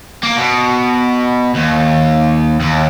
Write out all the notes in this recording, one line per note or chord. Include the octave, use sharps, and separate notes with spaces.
A#3
B2
D#2
D#2